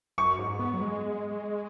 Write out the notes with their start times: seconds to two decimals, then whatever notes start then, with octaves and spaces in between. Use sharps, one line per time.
0.18 F#2 C#6
0.39 G#2
0.59 B3
0.74 F#3
0.81 G#3